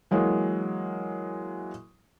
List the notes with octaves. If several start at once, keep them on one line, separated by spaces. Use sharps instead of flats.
E3 F#3 G#3 A#3